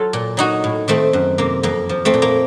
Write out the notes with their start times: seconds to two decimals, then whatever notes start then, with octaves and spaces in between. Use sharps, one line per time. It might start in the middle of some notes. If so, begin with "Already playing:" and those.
Already playing: F#3 F4 A4
0.13 A#2
0.37 F#3 D#4 F#4
0.64 A2
0.88 D#3 A3 C4
1.13 F#2
1.38 C3 A#3
1.63 F2 A#3
1.89 F3
2.05 A3 C4
2.14 A#2
2.22 A#3